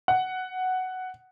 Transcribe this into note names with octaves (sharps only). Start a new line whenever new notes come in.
F#5